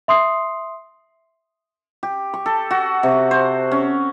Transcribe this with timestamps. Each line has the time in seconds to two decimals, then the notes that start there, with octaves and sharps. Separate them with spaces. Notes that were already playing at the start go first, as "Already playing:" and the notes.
0.08 E5 C6 D#6 C7
2.03 G4
2.34 C#6
2.46 A4
2.71 F#4
3.03 C3
3.31 C5
3.71 C#4